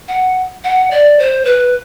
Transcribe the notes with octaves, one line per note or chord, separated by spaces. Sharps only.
F#5
F#5
D5
C5
B4